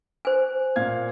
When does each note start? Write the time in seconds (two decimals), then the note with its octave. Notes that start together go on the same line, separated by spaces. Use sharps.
0.25 C5 G#5
0.76 A#2 F5 G#6